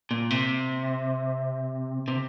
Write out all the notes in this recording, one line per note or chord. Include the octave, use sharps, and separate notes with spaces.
A#2
C3
C3